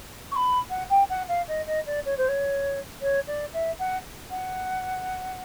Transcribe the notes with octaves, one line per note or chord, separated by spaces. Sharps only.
C#6
B5
F#5
G5
F#5
F5
D#5
D#5
D5
C#5
C5
C#5
C#5
D5
E5
F#5
F#5